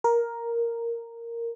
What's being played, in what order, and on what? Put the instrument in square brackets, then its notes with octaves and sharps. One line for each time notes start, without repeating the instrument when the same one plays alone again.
[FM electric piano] A#4